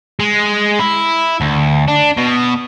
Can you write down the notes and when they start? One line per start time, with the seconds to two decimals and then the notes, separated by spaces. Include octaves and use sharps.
0.20 G#3
0.80 E4
1.41 D2
1.88 D4
2.18 B2